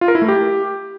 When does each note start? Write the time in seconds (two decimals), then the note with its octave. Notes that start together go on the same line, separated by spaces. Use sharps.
0.01 F4
0.08 A#4
0.15 E4
0.22 A3
0.28 G4